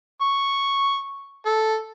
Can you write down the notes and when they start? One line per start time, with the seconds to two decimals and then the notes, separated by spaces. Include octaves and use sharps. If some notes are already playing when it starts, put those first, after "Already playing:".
0.22 C#6
1.46 A4